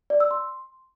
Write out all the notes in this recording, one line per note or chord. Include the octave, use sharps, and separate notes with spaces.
D5
E6
C6